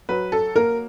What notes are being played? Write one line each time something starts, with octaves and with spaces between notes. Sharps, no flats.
F#3 B4
A4
A#3 A#4